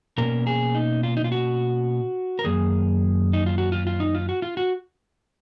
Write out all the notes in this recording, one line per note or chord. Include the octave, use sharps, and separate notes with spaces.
B2 A#3 C#4 A#4
G#4
D#4
F4
D#4
F4
F#4
A#4
F#2 D#3 A#3 G#4
D#4
F4
F#4
F4
F4
D#4
F4
F#4
F4
F#4